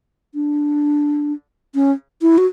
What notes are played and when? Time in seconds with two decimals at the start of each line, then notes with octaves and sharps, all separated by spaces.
0.34 D4
1.75 C#4
2.22 E4
2.38 F#4